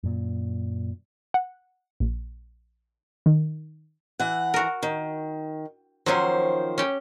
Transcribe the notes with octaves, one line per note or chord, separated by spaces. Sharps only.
F#2 A#2
F#5
A#1
D#3
E3 F#5
F#4 A#4
D#3
D#3 F3 F#3 C#4 C5
C#4 G4